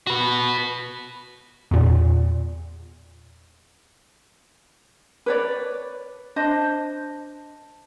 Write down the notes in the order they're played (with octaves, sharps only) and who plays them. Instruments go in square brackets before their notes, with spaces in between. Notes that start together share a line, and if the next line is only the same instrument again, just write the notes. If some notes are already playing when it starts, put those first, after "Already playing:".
[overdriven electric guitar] F#4 B4
[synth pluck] E2 A#2
[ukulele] B4 C#5 D5
D4 C5 D#5